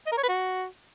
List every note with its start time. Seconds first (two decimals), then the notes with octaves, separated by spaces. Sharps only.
0.07 D#5
0.12 A#4
0.18 C#5
0.23 B4
0.29 F#4